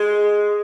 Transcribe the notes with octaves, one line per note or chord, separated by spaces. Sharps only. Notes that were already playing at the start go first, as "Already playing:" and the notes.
Already playing: G#3